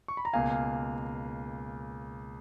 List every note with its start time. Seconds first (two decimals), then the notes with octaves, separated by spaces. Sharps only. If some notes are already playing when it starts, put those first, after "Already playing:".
0.08 C#6
0.17 B5
0.25 A#5
0.33 C#2 B2 A#3 F5 G#5